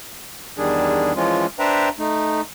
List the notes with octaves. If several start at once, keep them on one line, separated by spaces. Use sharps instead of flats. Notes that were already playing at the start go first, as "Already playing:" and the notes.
E2 D#3 G3 D4 G#4
E3 F3 G#3 C#4 F4
D4 B4 C5 E5 G5 A#5
A3 D#4